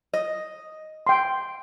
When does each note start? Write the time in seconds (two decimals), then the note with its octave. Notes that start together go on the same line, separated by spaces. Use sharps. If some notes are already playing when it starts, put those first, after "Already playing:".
0.13 D#5
1.07 G5 C6